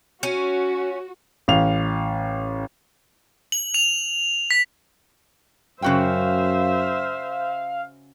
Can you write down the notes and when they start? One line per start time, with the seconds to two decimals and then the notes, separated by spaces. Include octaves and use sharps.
0.23 C#4 F#4
1.48 A1 F5 F7
3.52 F#7
3.74 F7
4.51 B6
5.82 F#2 C#3 F#4 C5 E5 F5 G5